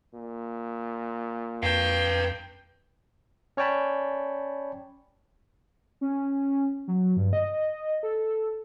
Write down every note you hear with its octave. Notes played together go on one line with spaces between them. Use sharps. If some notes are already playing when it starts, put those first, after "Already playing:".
A#2
F2 B4 F5 G5
C#4 C#5 D5 G5 A5 B5
C#4
F#3
G2
D#5
A4